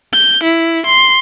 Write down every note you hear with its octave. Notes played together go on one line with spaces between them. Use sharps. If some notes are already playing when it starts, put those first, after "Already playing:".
G6
E4
C6